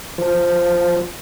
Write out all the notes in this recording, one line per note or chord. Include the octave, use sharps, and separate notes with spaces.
F3